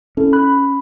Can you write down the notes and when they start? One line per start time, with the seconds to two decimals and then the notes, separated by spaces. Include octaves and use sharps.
0.17 C#4 E4 A4
0.33 B5 F#6